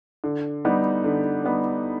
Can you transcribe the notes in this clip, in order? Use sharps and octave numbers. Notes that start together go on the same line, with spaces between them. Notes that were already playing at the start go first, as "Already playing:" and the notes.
D3
G3 B3 D#4
D3
G3 B3 D#4